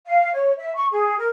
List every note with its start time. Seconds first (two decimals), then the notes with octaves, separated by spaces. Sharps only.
0.06 F5
0.33 C#5
0.57 E5
0.75 C#6
0.91 G#4
1.19 A#4